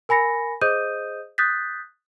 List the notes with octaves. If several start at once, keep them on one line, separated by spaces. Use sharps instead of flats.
A#4 G#5 B5 A#6 C#7
G#4 C5 D#5 D#6 G6 D#7
D#6 F#6 G6 A6 B6